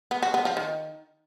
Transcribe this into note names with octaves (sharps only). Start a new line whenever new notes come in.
B3
F#4
B3
F3
D#3